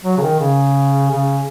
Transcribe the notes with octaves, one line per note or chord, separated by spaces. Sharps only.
F#3
C#3
D#3
C#3
C#3